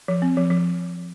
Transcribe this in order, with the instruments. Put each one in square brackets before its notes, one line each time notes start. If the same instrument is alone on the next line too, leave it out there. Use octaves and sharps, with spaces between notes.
[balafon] F3
C4
F3
F3